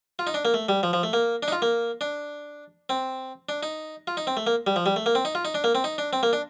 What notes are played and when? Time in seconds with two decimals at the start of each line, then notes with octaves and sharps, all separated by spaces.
0.19 F4
0.27 D#4
0.34 D4
0.45 A#3
0.54 A3
0.69 G3
0.83 F3
0.93 F3
1.03 A3
1.13 A#3
1.43 D4
1.48 D#4
1.52 F4
1.62 A#3
2.01 D4
2.90 C4
3.49 D4
3.63 D#4
4.07 F4
4.17 D#4
4.27 C4
4.37 A3
4.47 A#3
4.67 G3
4.76 F3
4.86 G3
4.96 A3
5.06 A#3
5.15 C4
5.25 D#4
5.35 F4
5.45 D#4
5.55 D4
5.64 A#3
5.75 C4
5.84 D#4
5.98 D4
6.13 C4
6.23 A#3
6.33 D4